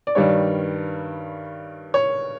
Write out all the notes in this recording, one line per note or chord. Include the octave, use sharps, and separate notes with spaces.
D5
G2 D#3 G3 C#5
C#5